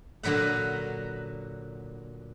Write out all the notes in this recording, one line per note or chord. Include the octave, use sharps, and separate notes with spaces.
A#2 D3 F#3 B4 F#5